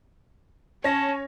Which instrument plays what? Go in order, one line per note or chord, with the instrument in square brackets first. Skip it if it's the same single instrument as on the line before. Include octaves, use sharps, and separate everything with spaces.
[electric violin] C#4 [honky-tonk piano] C#5 A#6 [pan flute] A5